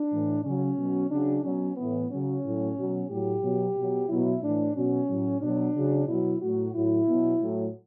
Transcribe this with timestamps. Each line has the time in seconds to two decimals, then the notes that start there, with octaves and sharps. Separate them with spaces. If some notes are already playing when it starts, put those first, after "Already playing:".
Already playing: D4
0.12 A2 E3
0.45 C#3 F#3 C#4
0.78 B2 F#3
1.11 C#3 F#3 D4
1.44 B2 F#3 C#4
1.77 A2 E3 B3
2.10 C#3 F#3 C#4
2.44 A2 F#3
2.76 B2 F#3
3.09 A2 F#3 G4
3.42 B2 F#3
3.76 B2 F#3
4.09 B2 F#3 E4
4.42 A2 E3 D4
4.76 B2 F#3 C#4
5.08 A2 F#3
5.42 B2 F#3 D4
5.75 C#3 F#3
6.08 B2 F#3 E4
6.41 A2 F#3 F#4
6.74 A2 F#3 E4
7.08 B2 F#3
7.41 A2 F#3